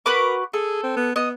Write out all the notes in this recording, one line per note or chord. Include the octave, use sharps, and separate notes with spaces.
F#4 A#4 B4 D6
G#4 A4
C4
B3
B3 D#5